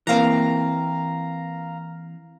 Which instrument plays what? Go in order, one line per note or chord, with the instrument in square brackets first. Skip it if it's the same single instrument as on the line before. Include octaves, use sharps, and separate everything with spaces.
[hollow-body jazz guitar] E3 A#3 C4 [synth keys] F5 A#5